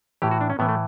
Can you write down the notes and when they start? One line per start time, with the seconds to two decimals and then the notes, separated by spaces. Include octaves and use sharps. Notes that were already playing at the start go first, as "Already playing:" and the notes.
0.22 A2 E3 G4
0.31 F#4
0.41 D4
0.50 C#4
0.59 A2 E3 B3
0.69 A3